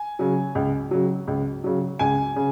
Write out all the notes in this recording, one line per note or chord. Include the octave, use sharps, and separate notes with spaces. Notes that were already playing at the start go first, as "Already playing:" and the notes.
Already playing: G#5
C#3 F#3
C#2
C#3 F#3
C#2
C#3 F#3
C#2 G#5
C#3